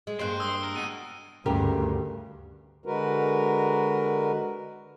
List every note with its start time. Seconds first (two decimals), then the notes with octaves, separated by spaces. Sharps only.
0.07 G#3
0.19 G2 G#3 A#3 C5 F#6 D7
0.40 D#6 E6 G7
0.63 A#4
0.76 B2 D#7
1.46 D2 G2 C#3 G4 A#4
2.86 D3 G#3 F#4 A#4 B4